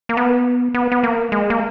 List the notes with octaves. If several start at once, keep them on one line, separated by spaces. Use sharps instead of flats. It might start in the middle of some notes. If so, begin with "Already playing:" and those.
A#3
B3
B3
B3
A#3
G#3
A#3